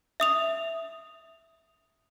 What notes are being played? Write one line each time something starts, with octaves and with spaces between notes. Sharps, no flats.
E5 D#6 F7